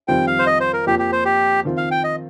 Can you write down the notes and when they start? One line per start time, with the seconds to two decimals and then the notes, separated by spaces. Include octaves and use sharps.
0.08 F2 D#3 G3 C4 F4 G5
0.27 F5
0.39 C5
0.47 D#5
0.60 C5
0.73 A#4
0.86 F2 F3 A#3 G4
0.99 G4
1.12 C5
1.25 G4
1.65 D#3 C4 F4
1.77 F5
1.91 G5
2.04 D#5